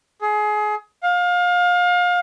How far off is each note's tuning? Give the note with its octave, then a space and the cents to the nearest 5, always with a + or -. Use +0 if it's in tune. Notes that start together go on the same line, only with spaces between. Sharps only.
G#4 +25
F5 +30